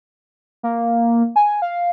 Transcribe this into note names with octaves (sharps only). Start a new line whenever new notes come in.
A#3
G#5
F5